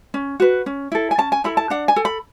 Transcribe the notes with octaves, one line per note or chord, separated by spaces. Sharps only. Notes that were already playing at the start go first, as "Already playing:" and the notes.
C#4
F#4 B4
C#4
E4 A4
G#5
C#4 A5
G#5
E4 A4 B5
A5
D4 F#5
G#5
A4
B5